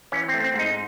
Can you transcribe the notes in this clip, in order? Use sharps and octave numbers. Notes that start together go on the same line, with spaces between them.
E3 C#4
C4
A3
C4
G#2
D#4